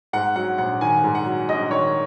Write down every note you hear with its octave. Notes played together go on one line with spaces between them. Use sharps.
G#2 F#5
F#3 F#5
A#1 F#5
D#3 G#5
G#2
F#5
F#3
A#1 D#5
D#3 C#5